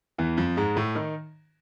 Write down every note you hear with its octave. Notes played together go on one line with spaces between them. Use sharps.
E2 E3
F2 F3
G#2 G#3
A2 A3
D#3 D#4